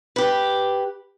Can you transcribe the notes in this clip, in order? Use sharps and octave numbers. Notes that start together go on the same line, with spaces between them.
G4 B4